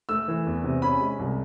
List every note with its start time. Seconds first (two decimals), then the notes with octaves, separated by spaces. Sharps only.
0.09 A3 E6
0.28 E3
0.46 E2
0.64 C3
0.82 C#4 B5
1.01 G#3
1.19 C2